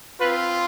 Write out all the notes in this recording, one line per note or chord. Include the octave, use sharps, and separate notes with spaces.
C4 F4 B4